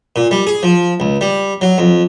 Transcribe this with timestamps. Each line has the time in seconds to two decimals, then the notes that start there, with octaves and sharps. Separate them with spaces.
0.16 A#2
0.31 G3
0.47 G#4
0.63 F3
1.00 C#2
1.21 G3
1.61 F#3
1.78 F2